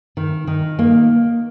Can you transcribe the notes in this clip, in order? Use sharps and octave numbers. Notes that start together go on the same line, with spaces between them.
D#3
D#3
A#3